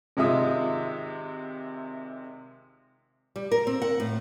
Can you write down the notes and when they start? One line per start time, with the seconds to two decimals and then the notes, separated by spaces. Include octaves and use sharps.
0.17 G#1 C3 G#3 F4 E5 D#6
3.36 G3
3.52 A#4
3.67 C4
3.82 F#5
4.00 A2